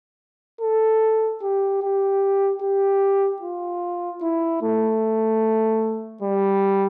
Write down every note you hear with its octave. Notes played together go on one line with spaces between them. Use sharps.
A4
G4
G4
G4
F4
E4
A3
G3